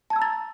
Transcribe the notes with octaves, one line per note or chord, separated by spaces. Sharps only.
A5 A#5 E6 G#6 A6